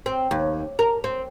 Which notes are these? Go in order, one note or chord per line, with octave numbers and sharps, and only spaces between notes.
C4
D#2
A#4
C4